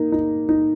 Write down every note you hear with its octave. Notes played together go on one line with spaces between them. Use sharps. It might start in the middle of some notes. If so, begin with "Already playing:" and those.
Already playing: A#3 D#4
D#4
D#4